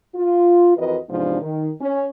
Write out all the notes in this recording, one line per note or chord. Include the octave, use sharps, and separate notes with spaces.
F4
F2 E3 F#4 A#4 B4 D#5
E2 G#2 C3 F3 D4
D#3
C#4